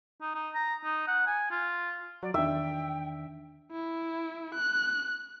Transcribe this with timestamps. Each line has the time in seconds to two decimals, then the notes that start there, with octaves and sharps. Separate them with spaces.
0.22 D#4
0.35 D#4
0.55 A#5
0.84 D#4
1.08 F#5
1.27 G#5
1.51 F4
2.23 F#3 D5
2.34 E2 D#3 D4 E5 G5
3.72 E4
4.54 F#6